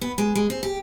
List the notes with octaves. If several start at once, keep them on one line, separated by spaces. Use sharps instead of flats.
B3
G#3
G#3
C4
G4